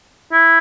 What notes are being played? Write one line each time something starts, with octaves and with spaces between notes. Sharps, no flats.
E4